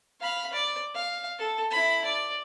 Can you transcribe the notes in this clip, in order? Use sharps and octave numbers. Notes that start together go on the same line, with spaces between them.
F5 B5
D5
F5
A4
E4 B5
D5